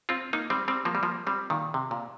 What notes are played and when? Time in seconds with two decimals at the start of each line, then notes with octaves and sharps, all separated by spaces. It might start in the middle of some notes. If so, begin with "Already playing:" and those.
0.09 C4 F4
0.33 A#3 D#4
0.50 G3 C4
0.68 G3 C4
0.85 F3 A#3
0.95 G3
1.03 F3 A#3
1.27 G3 C4
1.50 A#2 D#3
1.74 C3
1.91 A#2